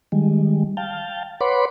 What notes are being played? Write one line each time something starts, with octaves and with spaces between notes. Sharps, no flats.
D#3 G3 G#3
F5 G5 A5
B4 C#5 F#5 B5 C6 D6